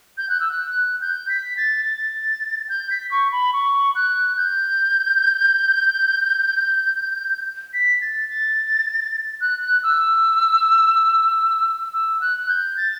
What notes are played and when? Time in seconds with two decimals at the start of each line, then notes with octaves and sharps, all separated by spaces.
0.18 G6
0.29 F#6
0.40 E6
0.51 F#6
1.01 G6
1.29 B6
1.57 A6
1.85 A6
2.69 G6
2.91 B6
3.11 C#6
3.32 B5
3.53 C#6
3.95 F#6
4.37 G6
7.73 B6
8.01 A6
8.29 A6
9.41 F#6
9.83 E6
11.93 E6
12.21 F#6
12.49 G6
12.77 A6